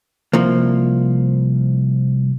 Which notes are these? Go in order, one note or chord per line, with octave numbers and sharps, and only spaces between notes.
C2 F3 A#3